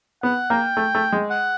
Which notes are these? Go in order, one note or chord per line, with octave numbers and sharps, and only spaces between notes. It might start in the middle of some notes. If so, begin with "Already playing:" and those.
B3 F#5
A#3 G5
A3
A3
G#3
F#5